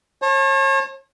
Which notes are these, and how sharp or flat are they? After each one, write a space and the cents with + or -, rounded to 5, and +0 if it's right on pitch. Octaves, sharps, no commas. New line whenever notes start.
C#5 -40 A5 +0